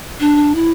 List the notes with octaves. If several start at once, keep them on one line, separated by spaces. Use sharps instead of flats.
D4
E4